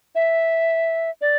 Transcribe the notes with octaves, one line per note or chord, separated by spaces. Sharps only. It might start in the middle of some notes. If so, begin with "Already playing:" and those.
E5
D5